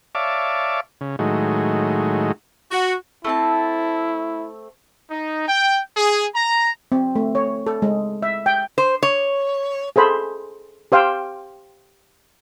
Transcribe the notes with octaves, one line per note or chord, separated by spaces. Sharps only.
C#5 D5 E5 F5 A5 D6
C#3
A2 D#3 F#3 G#3
F#4
A3 C4 E4 A5
D#4
G5
G#4
A#5
C4
A3
C#5
A4
G#3
E5
G5
C5
C#5
G#4 A4 C5 B5
G4 C5 F5 G5